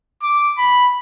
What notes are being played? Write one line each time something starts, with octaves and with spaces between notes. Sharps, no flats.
D6
B5